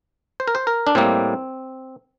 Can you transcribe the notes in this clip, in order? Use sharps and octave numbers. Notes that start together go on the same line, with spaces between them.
C5
A#4
C5
A#4
D4
A2 G3 A#3 C4